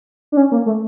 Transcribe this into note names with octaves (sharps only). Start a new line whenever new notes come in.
D4
C#4
A#3
A3